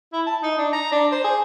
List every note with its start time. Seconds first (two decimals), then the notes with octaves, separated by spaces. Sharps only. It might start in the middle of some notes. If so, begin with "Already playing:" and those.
0.13 E4
0.27 A5
0.43 D#4
0.58 D4
0.73 A#5
0.92 D4
1.12 C5
1.24 G#4